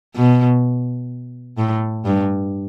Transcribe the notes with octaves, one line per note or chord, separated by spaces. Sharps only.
B2
A2
G2